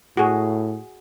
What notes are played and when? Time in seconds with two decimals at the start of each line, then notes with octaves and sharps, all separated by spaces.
0.17 A2 F#4 G#4